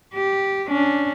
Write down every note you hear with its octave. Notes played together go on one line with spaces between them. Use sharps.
G4
C#4 D4